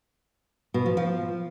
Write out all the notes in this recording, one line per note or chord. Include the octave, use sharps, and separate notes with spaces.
B2
F3
F3